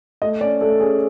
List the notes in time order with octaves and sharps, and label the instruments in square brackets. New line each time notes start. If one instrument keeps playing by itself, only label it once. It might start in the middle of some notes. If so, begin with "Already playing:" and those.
[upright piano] A3 [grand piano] D#5
[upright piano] C#4 [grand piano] D5
[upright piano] A3 [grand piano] A4
[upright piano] C#4 [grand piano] G#4